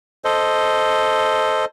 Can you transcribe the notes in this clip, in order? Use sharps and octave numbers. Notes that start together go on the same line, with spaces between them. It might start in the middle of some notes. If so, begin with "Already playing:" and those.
A4 C5 D#5